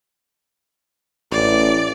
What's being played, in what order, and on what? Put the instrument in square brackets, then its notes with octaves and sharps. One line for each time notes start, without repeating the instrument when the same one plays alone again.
[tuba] A1 [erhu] D5